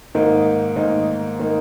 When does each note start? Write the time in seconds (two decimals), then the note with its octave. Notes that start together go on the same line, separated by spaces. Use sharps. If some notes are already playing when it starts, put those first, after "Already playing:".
0.15 G#2 D#3 A#3 D#4
0.76 G#2 D#3 A#3 D#4
1.39 D#3 A#3 D#4